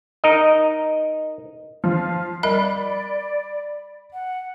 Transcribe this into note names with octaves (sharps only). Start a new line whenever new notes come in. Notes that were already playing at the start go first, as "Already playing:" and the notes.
D#4 A#4 D#5
F3 F5
G3 A#4 D5 D#5 B5
F#5